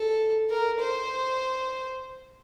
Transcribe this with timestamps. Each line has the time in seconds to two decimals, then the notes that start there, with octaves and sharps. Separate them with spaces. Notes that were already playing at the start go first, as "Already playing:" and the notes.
Already playing: A4
0.50 A#4
0.80 C5